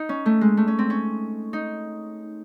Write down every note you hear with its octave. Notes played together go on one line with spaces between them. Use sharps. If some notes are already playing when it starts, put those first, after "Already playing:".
Already playing: D#4
C#4
A3
G#3
A3
C#4
C4
C#4
D#4